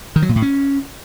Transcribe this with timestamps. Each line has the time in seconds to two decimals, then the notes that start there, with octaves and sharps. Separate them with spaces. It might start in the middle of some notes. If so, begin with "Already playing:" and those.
0.16 D#3
0.22 F#3
0.29 A#2
0.36 A2
0.42 C#4